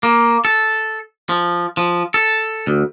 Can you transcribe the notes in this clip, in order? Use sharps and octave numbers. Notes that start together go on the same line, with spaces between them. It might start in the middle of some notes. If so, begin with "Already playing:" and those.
A#3
A4
F3
F3
A4
D2